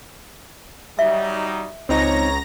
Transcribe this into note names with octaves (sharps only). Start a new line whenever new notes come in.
F#3 G3 D#4 E5
C#2 C4 D#4 C#5 A#5 A#6